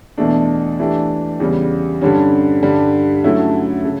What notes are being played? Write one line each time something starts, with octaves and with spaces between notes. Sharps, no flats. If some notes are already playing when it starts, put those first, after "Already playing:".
E2 B2 A3 D4
E3 A3 D4 G4
E2 C#3 G3
G2 D3 G3 C#4
G2 D3 G3
D3 F#3 A3 C#4 E4
C#3